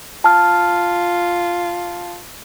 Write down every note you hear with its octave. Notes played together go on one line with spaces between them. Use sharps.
F4 A5 F6